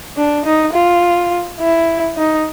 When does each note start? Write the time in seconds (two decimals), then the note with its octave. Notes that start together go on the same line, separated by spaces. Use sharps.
0.17 D4
0.45 D#4
0.73 F4
1.60 E4
2.17 D#4